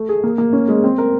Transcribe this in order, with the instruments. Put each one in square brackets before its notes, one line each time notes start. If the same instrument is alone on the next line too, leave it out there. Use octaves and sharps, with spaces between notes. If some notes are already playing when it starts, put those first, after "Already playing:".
Already playing: [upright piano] A3
G#4
A#3
A#3
C#4
G#3
C4
A#4